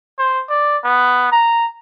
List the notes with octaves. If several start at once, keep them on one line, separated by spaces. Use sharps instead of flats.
C5
D5
B3
A#5